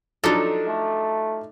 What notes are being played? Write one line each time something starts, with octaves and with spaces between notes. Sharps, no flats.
F3 F#3 D4 D#4 A4
A3